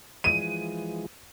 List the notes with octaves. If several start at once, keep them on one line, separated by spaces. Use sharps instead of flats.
E3 F3 G#3 D#7